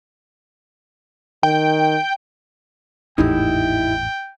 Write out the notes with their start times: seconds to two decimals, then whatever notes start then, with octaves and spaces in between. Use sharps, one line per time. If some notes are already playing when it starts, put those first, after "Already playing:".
1.43 D#3 G5
3.18 G#1 E2 A2 D#4 E4 G4 G5